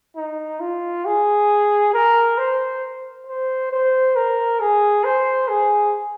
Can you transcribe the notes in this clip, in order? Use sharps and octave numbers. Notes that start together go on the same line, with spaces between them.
D#4
F4
G#4
A#4
C5
C5
C5
A#4
G#4
C5
G#4